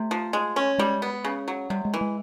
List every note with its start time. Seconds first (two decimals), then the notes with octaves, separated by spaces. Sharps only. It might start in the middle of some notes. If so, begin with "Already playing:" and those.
Already playing: C3 A3
0.11 F3
0.33 G#3
0.56 C#4
0.78 G3 G#3
1.02 B3
1.25 C#3
1.48 F#3
1.70 C3 G3
1.85 G#3
1.94 E3
2.01 G#3